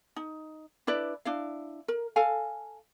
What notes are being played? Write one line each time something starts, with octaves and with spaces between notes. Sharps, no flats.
D#4
D4 E4 B4 D5
D4 E4 F5
A#4
A4 F5 G#5